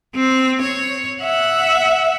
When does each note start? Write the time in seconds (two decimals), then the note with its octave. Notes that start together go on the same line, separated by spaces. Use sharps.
0.15 C4
0.62 C#5
1.22 E5 F#5